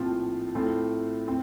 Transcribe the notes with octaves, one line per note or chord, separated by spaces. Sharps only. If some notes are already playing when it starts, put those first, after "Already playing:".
Already playing: A#1 A2 F3 C4 F4
A2 A3 C4 F4
C4